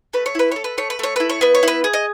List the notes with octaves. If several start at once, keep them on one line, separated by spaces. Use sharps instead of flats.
A3 B4
C#5
E4 B4
A4 C#5
B4
A3 C#5
B4
A3 C#5
E4 B4
C#5
B3 B4
C#5
E4 B4
G#4
D#5